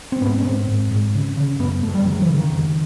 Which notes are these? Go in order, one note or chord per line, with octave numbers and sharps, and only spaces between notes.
C4
G#2 B3
C#4
G#2 C4
G#2
G#2
C#3
C#3
F#2 B3
F#2 A3
G3
C#3 F#3
E3
C#3
D#3
F2